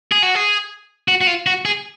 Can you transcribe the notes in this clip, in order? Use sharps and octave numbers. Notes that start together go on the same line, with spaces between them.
G#4
F#4
G#4
F#4
F#4
F4
F#4
G#4